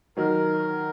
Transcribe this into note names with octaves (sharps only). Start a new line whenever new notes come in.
D#3 F#3 A#4